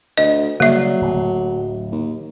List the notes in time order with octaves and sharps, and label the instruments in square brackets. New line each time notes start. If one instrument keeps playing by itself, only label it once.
[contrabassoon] D2 [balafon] D#5
[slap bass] C#3 G3 [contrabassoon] F#3 [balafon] A#3 E5
[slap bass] D1
[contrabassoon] D#2